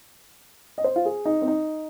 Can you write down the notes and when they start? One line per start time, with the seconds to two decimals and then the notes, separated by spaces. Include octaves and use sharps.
0.78 D#5
0.84 C5
0.96 F4
1.06 G#4
1.25 D#4
1.42 C4
1.48 D#4